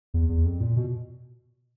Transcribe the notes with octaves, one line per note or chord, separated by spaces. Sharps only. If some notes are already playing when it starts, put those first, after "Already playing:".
E2
E2
F2
A#2
B2